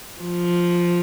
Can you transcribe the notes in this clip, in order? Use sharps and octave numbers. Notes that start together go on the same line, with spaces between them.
F3